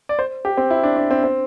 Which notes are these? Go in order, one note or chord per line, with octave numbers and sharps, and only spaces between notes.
D5
C5
G4
C4
E4
D4
D4
C4
C4